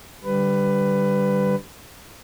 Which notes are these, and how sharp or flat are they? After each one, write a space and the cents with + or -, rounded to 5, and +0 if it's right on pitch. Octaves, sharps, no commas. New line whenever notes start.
D3 +0 G3 +0 B4 +15